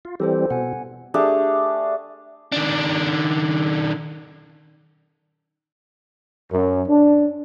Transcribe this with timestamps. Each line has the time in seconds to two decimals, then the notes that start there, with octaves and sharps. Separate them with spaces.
0.05 F4
0.20 E3 G3 C4 G4 A4 C5
0.50 B2 F#5 G#5
1.14 A3 D4 G4 G#4
2.52 D#3 D4
6.52 F#2
6.89 D4